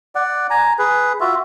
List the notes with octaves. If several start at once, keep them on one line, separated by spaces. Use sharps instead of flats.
D5 F#5
G#5 A#5
G#4 B4
F4 F#4 E5